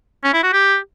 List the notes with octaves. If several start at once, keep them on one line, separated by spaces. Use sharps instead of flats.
C#4
E4
F#4
G4